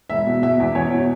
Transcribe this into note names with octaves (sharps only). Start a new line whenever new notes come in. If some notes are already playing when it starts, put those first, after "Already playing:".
E1 E5
B2
B2 E5
E2
E2 C#5
B2